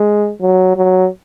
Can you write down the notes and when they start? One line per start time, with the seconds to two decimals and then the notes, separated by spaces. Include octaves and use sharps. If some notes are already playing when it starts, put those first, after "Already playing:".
Already playing: G#3
0.42 F#3
0.76 F#3